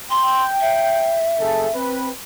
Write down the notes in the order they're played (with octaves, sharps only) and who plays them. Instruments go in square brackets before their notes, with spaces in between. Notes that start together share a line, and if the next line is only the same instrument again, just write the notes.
[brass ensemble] G5 [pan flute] C6
[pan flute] E5
[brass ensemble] F#1 G#4 A4
C4 B4